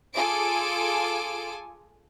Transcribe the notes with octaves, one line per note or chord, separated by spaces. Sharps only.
F4 G#4 A4 G#5 D6 D7